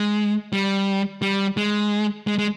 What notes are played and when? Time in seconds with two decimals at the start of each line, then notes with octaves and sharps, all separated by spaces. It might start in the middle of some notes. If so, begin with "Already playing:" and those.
Already playing: G#3
0.53 G3
1.22 G3
1.57 G#3
2.27 G#3
2.38 G#3